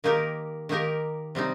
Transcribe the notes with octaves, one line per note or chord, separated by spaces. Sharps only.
D#3 A#3 D#4 G4 A#4
D#3 A#3 D#4 G4 A#4
C3 G3 C4 D#4